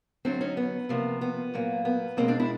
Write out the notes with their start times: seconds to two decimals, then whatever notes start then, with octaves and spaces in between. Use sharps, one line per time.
0.25 D3 F#3 A3 C4 D4
0.41 C#4 D#4
0.57 B3
0.89 C3 F3 A#3
1.21 B3
1.54 A#2 F#3 A#3
1.85 B3
2.17 B2 G#3 A#3 C4
2.28 C4 D4
2.39 D4 E4